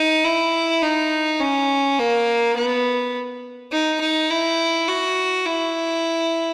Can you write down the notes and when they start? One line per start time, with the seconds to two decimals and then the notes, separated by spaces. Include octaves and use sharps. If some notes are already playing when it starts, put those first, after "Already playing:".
Already playing: D#4
0.25 E4
0.83 D#4
1.40 C#4
1.99 A#3
2.56 B3
3.72 D#4
4.00 D#4
4.31 E4
4.87 F#4
5.45 E4